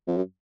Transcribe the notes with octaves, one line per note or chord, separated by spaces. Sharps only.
F2
F#2